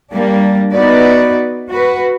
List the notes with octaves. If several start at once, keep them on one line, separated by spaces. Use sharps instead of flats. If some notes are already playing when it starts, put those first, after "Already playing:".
G3 A#3 D4
B3 D#4 F#4 B4 D5
F#4 B4